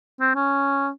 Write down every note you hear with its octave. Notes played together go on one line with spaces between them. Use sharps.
C4
C#4